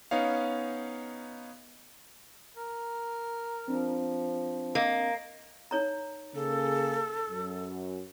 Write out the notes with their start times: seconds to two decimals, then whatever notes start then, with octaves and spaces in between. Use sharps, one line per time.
0.11 B3 C#4 D#4 C#5 F5
2.57 A#4
3.68 F3 C4 D4
4.75 A#3 D#5
5.71 D#4 C#5 A#5
6.35 C#3 A#3 G#4 A4
7.30 F#2